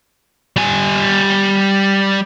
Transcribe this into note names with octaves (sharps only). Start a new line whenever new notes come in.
G3 G#5